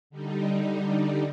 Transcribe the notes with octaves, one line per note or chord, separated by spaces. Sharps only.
D3 G3 D#4